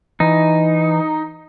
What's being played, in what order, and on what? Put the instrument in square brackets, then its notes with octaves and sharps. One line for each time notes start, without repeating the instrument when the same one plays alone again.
[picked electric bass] E3 [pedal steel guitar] D#4